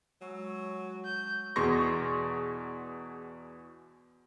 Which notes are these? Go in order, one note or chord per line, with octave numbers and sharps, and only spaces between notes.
F#3 G#3 C#6 E6
G6
E2 B2 G#4 C6 C#6 A#6